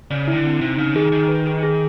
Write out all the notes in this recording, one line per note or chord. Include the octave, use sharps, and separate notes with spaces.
C#3 D5
D#3 E4
D3
C4
C3 D#4
C#3 D#4
D#3 G#4
D#3 D#4
B4
G#4
G#4